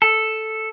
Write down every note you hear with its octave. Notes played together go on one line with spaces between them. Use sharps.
A4